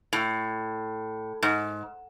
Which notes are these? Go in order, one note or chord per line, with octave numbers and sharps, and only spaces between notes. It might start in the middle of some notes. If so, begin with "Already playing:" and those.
A2
G#2